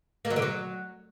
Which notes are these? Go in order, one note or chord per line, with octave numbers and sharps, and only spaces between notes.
A#3
F#3
D3
F#3